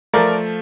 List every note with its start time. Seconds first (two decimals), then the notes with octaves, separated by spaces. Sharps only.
0.14 F3 A3 A#4 D5